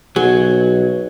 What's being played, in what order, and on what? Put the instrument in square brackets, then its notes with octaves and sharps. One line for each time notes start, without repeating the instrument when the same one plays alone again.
[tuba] B1 [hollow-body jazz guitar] F#3 [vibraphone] F#4 [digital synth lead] G#4